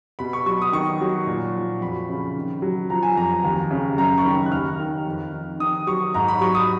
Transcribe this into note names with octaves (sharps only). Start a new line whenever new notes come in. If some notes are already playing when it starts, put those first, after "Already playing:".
B2 B5
C#6
F#3 C#6
D#6
D#3 C#6
F#3
A#2
F3
F2 B5
C#3
D#3
F#3
F3 A#5
G#5
F2 A#5
D#2
C#3
F#2 A#5
C#6
D#3 B5
F#6
D#2 F6
D#3
F2
D#3
D#3 D#6
F#3 C#6
G#2 A#5
B5
F#3 C#6
D#6